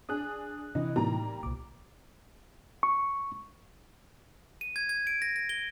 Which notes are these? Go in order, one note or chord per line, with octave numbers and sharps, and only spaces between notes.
D4 G#4 D#6 F#6
C3 E3 D#4
A2 G3 A#3 D#4 A#5
C2 A#2 D6
C#6
D#7
G#6
G#6
D7
A#6
A#6
G7